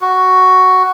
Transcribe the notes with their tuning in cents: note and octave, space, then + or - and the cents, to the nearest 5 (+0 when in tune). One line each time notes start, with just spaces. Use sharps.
F#4 +5